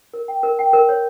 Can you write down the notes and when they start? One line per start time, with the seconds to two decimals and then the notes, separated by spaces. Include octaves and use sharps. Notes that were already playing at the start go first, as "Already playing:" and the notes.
0.14 A#4
0.28 G5
0.43 A#4
0.59 G5
0.73 A#4
0.89 C#5